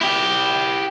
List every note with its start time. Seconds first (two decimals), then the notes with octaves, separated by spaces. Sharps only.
0.01 E4 G4